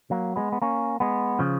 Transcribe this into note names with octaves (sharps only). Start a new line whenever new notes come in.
F#3 A#3
G#3 B3
B3
A#3 C#4
G#3 B3
C#3 F3